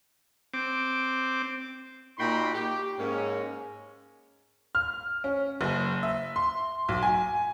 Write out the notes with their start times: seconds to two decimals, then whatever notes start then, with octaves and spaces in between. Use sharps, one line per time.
0.54 C4 D6
2.18 A#2 D#4 F#4 G5 B5 C6
2.54 G4
2.98 G#2 A#3 C#4
4.75 F6
5.24 C#4
5.61 F#1
6.03 E5
6.36 C6
6.89 B1
7.03 G#5